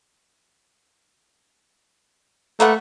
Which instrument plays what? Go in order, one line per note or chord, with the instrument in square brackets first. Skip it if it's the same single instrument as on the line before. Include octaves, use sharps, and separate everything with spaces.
[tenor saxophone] A3 [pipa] A#3 B4 F#5